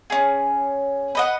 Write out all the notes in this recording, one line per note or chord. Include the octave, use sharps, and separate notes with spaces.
C#4 G#4
B4 D#5 F#5